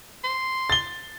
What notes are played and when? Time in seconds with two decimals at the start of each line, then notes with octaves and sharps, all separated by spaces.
0.24 C6
0.70 A6 G7